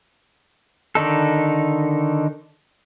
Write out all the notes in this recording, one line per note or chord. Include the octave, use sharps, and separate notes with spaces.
D3 D#3 D#4 A4